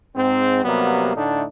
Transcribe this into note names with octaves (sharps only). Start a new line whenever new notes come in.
G#2 C4
C3 F#3 G3 A#3 B3
A2 D3 A3 D4 D#4